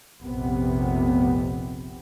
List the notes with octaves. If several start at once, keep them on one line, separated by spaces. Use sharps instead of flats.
F1 A#1 C3 B3